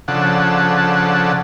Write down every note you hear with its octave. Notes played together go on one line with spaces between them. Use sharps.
C#3 F3 D4 A4 F#5